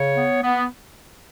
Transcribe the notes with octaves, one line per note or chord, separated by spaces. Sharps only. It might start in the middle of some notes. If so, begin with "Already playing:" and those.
Already playing: C#3 C#5
B3
B3